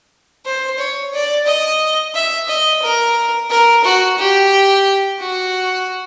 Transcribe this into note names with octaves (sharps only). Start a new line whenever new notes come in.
C5
C#5
D5
D#5
E5
D#5
A#4
A#4
F#4
G4
F#4